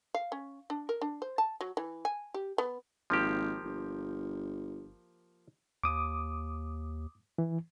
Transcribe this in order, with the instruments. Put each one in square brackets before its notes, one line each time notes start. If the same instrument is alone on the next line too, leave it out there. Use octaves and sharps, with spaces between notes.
[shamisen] F5
C#4
D4
A#4
D4
C5
A5
F#3
E3
G#5
G4
B3
[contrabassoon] G#1 [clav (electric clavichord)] F3 A#3 G4
[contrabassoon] G1
[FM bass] D#2 [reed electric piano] D6 D#6
[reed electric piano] E3